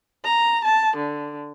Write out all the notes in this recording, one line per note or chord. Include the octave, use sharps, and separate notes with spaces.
A#5
A5
D3